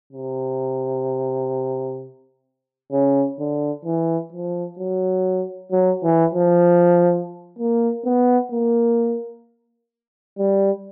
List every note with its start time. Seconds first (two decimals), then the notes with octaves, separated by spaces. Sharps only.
0.13 C3
2.92 C#3
3.39 D3
3.85 E3
4.33 F3
4.79 F#3
5.72 F#3
6.04 E3
6.35 F3
7.59 A#3
8.06 B3
8.52 A#3
10.38 G3